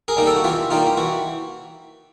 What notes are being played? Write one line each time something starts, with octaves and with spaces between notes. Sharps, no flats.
G#4 A#4
G3 A#3 D#4
G4 A4
F#4
E3 F4 G4
G3 A#3 D#4 F4 G4
G4
E3 F#4